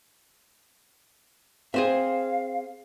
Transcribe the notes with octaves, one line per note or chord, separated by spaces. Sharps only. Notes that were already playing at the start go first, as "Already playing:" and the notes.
C4 G#4 C5 E5 F5